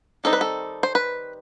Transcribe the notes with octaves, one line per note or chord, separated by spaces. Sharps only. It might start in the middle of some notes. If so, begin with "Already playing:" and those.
D#3 G3 C4 D#4 A4
B4
A4
C5
B4